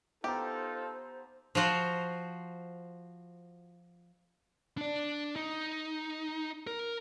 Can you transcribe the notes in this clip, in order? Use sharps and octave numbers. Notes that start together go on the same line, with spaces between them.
B3 D#4 F4 G4 A4 C5 A#5
F3 F4 F#4 C5
D4 D5
D#4
A#4